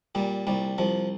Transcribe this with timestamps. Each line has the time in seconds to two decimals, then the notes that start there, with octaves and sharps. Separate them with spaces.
0.15 A#2 G3
0.47 C2 G3
0.78 C2 F3